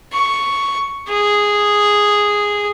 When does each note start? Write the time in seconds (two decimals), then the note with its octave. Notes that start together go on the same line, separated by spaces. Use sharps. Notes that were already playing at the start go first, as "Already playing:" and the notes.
0.13 C#6
1.09 G#4